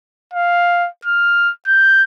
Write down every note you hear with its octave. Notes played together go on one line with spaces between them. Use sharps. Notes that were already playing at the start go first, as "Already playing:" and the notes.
F5
F6
G6